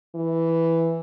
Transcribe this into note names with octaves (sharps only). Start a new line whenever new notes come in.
E3